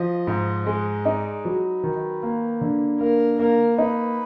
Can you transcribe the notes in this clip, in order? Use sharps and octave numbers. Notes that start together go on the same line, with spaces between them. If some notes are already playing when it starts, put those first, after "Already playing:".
Already playing: F3 D#5
G#2
G#3 D#5
D#4 D5
F#3 B4
D#3
A#3
D3
A#3 A#4
A#3 A#4
D#4 B4